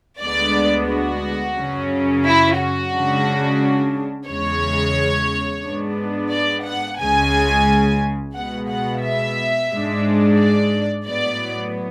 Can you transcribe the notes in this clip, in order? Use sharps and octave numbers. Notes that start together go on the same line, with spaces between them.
D2 D3 G#3 B3 D4 D5
F#4
F#2 C#3 F#3 C#4
E4
F#4
C#3 G#3 D4
E2 C#3 G#3 C#5
G#2 G#3 B3 D4
D5
F#5
C#2 C#3 G#3 G#5
B2 G#3 B3 F#5
F#5
E5
G#2 G#3 D4
D5
A2 F#3 B3 D5